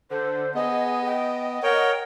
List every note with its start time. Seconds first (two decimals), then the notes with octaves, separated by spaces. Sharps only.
0.10 D3 C5
0.55 B3 G#4 D#5
1.06 G5
1.63 A#4 C#5 F#5 G5